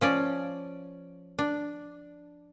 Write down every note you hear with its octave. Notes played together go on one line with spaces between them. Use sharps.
F3 C#4 D5
D4